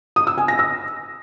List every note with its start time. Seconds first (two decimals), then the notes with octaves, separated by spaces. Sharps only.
0.16 D#6
0.27 E6
0.38 G#5
0.48 A#6
0.59 E6